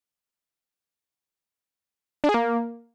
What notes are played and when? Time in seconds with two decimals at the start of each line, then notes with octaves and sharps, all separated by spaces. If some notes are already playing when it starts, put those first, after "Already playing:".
2.24 D4
2.29 G#4
2.34 A#3